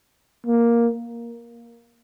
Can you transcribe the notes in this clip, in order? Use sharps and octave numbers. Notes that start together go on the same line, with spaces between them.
A#3